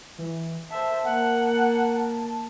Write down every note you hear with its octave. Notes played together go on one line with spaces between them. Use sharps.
E3
C5 E5 A5
A#3 A#4 F#5
A5